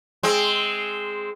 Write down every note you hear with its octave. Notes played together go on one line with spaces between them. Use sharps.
G#3 C4